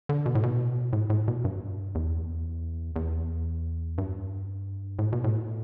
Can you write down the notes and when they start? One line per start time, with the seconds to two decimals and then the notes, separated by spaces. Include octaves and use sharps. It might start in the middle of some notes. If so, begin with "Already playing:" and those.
0.09 D3
0.26 B2
0.35 A2
0.43 B2
0.93 A2
1.10 A2
1.28 B2
1.45 G2
1.95 E2
2.96 E2
3.98 G2
4.99 A2
5.13 B2
5.24 A2